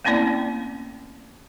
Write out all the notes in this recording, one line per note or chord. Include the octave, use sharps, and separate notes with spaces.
A3 A#3 C4 C#4 E4 D5